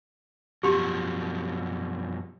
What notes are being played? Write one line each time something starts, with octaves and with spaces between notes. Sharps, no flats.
F#2 B2 F3 G4 C6